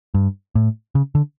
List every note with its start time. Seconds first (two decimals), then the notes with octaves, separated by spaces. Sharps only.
0.14 G2
0.55 A2
0.95 C#3
1.15 D3